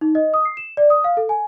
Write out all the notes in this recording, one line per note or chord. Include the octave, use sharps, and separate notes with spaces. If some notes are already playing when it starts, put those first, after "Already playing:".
D#4
D#5
D#6
C7
E7
D5
D#6
F5
A4
G#5